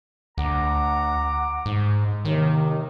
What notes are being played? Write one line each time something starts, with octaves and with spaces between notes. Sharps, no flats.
D2 F#5 A#5 D6
G#2
D#2 C3 D#3